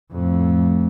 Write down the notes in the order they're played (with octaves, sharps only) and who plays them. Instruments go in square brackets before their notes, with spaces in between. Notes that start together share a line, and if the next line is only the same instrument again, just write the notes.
[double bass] F2 A2